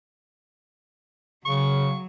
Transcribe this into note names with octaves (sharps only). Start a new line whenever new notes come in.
C#3 F#3 C#6